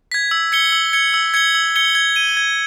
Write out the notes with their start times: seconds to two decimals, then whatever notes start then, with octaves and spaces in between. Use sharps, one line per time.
0.12 G#6 B6
0.31 E6
0.52 G#6 C#7 G7
0.72 E6
0.93 G#6 C#7 G7
1.14 E6
1.34 G#6 C#7 G7
1.55 E6
1.76 G#6 C#7 G7
1.95 G#6
2.16 D#7 G7
2.37 G#6